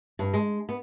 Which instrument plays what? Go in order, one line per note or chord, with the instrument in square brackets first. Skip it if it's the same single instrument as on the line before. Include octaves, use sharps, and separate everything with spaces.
[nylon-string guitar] G2
G#3
B3